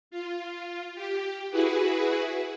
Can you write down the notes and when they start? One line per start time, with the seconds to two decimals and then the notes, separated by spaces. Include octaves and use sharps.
0.11 F4
0.95 G4
1.51 E4 F#4 G#4 B4